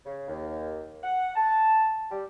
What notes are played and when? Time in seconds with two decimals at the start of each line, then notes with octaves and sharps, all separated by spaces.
0.05 C#3
0.28 D#2
1.02 F#5
1.36 A5
2.11 G3